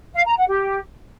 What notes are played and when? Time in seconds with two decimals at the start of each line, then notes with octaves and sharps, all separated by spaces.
0.15 F5
0.26 A#5
0.37 F#5
0.48 G4